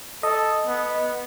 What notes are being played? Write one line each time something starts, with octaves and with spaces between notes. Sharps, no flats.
A4 D#5
B3